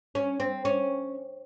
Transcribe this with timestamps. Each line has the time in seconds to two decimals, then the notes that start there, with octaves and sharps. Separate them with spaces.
0.15 C#4
0.40 C4
0.65 C#4